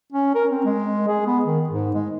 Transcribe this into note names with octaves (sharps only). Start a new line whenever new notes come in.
C#4
A#4
C4
G#3
G#4
B3
D#3
G#2
G#3